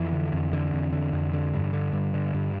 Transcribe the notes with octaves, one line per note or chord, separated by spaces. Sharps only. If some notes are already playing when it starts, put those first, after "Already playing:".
Already playing: F2 E3
D3
F2
D3
F2
D3
F2
D3
G2
D3
G2
D3
G2